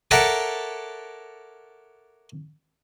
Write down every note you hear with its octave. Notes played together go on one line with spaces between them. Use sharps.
A4 A#4 C#5 D5 E5 F#5